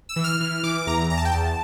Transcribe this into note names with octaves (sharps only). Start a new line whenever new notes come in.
E6
E3
F6
E3 F6
E3 D6
E2 A#5
E2 A#5
A5
G5
E2 A5